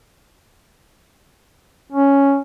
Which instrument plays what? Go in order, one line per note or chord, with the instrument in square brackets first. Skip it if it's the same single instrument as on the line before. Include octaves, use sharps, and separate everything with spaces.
[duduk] C#4